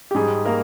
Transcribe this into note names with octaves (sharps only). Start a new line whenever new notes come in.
G4
G#2 G3 G#4
A#3 A#4